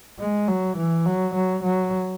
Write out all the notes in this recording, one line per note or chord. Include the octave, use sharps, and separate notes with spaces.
G#3
F#3
E3
F#3
F#3
F#3